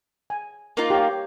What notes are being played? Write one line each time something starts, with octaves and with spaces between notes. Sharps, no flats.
G#5
A#3 D#4 F4
G4 C#5